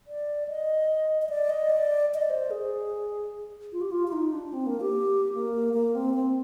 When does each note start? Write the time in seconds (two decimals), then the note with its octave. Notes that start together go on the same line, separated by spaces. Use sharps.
0.07 D5
0.48 D#5
1.22 D#5
1.29 D5
1.49 D#5
1.69 D5
2.14 D#5
2.22 D5
2.30 C5
2.51 G#4
3.72 F4
3.81 G4
3.91 F4
4.07 F4
4.12 D#4
4.32 D4
4.53 C4
4.66 A#3
4.80 G4
5.34 A#3
5.74 A#3
5.95 C4
6.14 C4